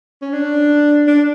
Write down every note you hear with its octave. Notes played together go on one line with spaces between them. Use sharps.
C#4
D4
D4